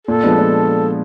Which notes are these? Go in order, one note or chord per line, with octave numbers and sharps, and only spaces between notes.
A#2 A4
F3 G#3 B3 D4
A#2